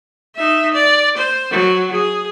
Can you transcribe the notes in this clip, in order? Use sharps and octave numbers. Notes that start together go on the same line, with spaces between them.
D#4 E5
D5
C5
F#3
G#4